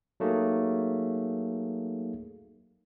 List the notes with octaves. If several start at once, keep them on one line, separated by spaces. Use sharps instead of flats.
F#3 A3 A#3 D#4 G#4